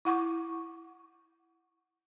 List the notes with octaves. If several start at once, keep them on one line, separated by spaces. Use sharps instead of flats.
E4 F#5 C#6 D6